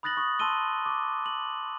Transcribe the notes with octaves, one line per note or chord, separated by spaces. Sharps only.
B5 D#6 F#6 A6 A#6 F#7
C#6 D#6
A5 C6 E6 D#7 G7
C#6 D6
F#7